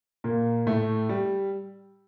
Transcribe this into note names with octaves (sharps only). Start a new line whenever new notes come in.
A#2 A#3
A2 A3
G3